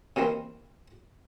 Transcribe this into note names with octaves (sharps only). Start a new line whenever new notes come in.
C3 D#3 E3 A#3 C4